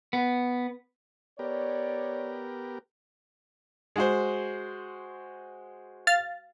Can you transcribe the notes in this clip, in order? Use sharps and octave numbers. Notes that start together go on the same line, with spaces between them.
B3
B3 G4 A#4 C#5 D5
G#3 F#4 C5
F5 A6